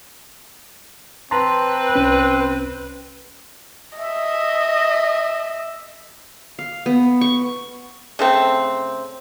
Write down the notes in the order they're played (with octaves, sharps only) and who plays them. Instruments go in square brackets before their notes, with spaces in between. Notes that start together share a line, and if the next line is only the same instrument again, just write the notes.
[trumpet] C4 [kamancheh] B4 [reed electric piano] A5 A#5 C6
[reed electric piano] C2 C#4
[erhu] D#5 [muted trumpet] E5
[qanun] F5
B3
C#6
[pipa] C#3 A3 C4